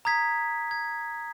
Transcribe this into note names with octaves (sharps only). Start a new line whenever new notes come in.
A#5 D#6 G#6 B6
G#6